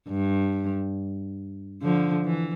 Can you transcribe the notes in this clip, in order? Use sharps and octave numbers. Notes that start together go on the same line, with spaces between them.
G2
D3 F3
E3